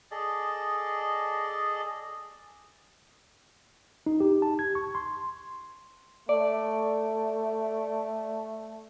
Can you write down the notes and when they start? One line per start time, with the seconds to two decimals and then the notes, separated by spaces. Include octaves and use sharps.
0.11 G#4 A4 D5 D#5
4.06 D#4
4.20 G4
4.42 A5
4.59 G#6
4.75 C#6
4.95 C6
6.29 A3 D5